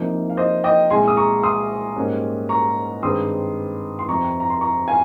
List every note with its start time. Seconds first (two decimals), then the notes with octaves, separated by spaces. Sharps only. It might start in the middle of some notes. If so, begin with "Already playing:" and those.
Already playing: C2 C3 F3 A#3 D#4
0.30 F5
0.37 C5 D#5
0.64 D#5 G5
0.90 C2 A#2 G#3 G#5 C6
1.08 D#6
1.17 A#5 C#6
1.43 C6 D#6
1.96 G#2 G3 A#3 C#4
2.49 A#5 C#6
3.02 G2 D#3 G#3 C4 D#4 C6 D#6
3.99 C6
4.08 F2 C3 F3 C4 A#5 C#6
4.40 A#5
4.50 C6
4.61 A#5 C#6
4.88 F5 G#5